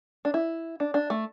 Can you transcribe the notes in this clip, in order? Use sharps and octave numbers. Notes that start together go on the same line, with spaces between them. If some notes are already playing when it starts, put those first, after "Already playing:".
D4
E4
D4
D4
A3